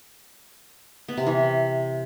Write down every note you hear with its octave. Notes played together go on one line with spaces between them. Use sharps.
B3
C3
E3